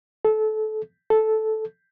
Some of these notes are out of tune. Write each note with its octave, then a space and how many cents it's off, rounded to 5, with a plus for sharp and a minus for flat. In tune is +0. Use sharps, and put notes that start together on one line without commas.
A4 -25
A4 -10